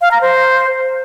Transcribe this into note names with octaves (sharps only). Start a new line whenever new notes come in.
F5
A#5
C5